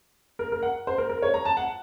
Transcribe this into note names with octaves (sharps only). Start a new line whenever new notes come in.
A#4
A#4
F#5
C5
A#4
A#4
C#5
A#5
A5
F#5